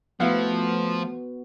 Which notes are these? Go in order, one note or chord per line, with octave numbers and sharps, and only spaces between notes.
F3 A3 B3 E4 F#4 F5 F#5